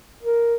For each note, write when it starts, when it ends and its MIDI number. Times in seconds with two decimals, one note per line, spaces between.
0.23 0.56 70